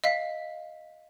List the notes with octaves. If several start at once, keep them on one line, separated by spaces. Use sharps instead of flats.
D#5 F5 B6